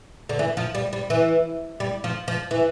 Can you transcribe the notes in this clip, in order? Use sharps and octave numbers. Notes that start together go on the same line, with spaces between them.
D3
E3
F3
G3
G3
E3
G3
F3
F3
E3